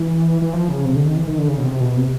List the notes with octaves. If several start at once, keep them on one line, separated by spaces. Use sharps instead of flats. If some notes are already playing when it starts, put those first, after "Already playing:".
Already playing: E3
E3
F3
C#3
C3
D3
D#3
E3
D#3
D3
C#3
B2
C3
B2
C3